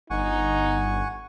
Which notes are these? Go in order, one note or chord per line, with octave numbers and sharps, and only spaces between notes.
G1 D#4 F#5 G#5 C#6